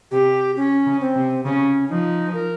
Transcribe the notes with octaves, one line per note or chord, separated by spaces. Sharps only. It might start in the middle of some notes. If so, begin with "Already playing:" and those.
C3 G4
C#4
C#3
C4
C3
C#3 C#4
F3 D#4
A#4